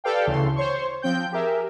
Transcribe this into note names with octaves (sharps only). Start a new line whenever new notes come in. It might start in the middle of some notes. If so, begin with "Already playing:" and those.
G4 A4 B4 D5 F5 G5
D2 C#3 E3 A4 C6
C5 C#5 C6 C#6
F3 C4 G5 G6
G4 G#4 A#4 E5